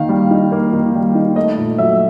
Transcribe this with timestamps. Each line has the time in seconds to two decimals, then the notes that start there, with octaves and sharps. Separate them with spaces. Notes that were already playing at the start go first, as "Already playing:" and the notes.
Already playing: D#3 A#3 F5
0.09 G3
0.31 D#4
0.52 A#3
0.73 D#3
0.95 G3
1.15 D#4
1.36 A3 D#5
1.57 A#2
1.78 F#3 E5